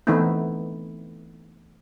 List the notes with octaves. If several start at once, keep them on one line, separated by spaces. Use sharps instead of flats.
E3 A3 B3 C4 D#4 E4